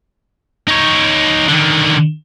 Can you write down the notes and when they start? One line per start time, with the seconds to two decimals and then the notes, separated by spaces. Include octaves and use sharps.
0.68 D#4 C#5
1.48 D3 D#3